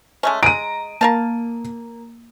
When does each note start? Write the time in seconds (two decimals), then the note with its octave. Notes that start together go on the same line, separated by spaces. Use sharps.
0.23 G#3 A3 C#4
0.43 G#3 A#5 D7 D#7
1.01 A#3 A#4 F5 A5